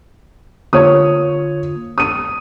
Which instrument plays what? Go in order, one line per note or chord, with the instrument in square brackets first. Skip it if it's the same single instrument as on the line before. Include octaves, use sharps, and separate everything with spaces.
[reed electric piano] D3 A#3 F4 [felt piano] C#5 D#6
[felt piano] D#6 D#7